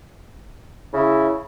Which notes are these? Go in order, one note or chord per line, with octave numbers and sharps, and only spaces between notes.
C#3 E4